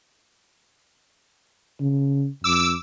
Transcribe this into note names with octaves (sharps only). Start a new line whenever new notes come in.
C#3
F2 D6 E6